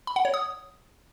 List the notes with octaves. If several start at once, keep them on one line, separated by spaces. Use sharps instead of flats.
B5
F#5
C#5
D#6